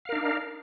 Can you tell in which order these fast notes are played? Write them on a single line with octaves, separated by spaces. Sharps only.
F5 A#4 D#4 D4